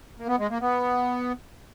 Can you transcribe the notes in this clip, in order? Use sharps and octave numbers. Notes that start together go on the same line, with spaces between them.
A#3
B3
G#3
A#3
B3